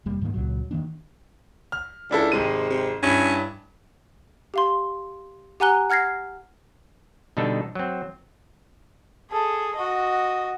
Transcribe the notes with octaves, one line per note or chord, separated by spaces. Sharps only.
F1 G3 A#3
G#2 D#3 F3 A#3
C#2 A#2 F#3
D#3 F3 A#3 D4
F6
C#2 D4 E4 A4
G#1 C3 G#3 D#7
C3
G2 C#4 E4
G4 F5 C6
G4 F#5 G#5 A#5 F#6 G7
F#5 F6 G#6 A#6 C7
B2 D3 G3 D4 D#4 A4
F#3 C4
G#4 A4
F#4 D#5